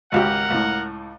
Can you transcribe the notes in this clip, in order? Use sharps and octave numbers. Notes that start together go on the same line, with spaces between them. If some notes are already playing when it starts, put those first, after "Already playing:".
G#1 C#2 G4 A#4 F#5
C#2 A2